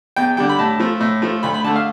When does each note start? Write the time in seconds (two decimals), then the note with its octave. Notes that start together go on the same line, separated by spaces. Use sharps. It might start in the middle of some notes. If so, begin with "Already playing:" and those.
0.16 E2 G5
0.37 D3 G3 G5
0.49 B5
0.59 A2 A5
0.80 F3 A3
1.00 A2
1.22 F3 A3
1.43 D2 B5
1.54 B5
1.64 D3 A5
1.68 A3
1.75 F5